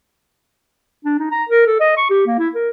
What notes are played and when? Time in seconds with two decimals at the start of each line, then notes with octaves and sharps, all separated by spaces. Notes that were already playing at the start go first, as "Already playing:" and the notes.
1.05 D4
1.19 D#4
1.31 A#5
1.49 A#4
1.66 A4
1.80 D#5
1.97 C#6
2.10 G4
2.26 A#3
2.38 E4
2.55 A#4